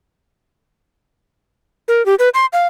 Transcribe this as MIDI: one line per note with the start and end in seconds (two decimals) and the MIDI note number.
1.88 2.05 70
2.06 2.15 67
2.19 2.29 71
2.34 2.46 84
2.53 2.67 77